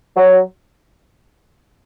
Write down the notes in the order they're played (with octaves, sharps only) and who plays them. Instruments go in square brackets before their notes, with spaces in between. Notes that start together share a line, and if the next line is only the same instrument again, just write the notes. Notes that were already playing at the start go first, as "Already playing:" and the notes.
[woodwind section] F#3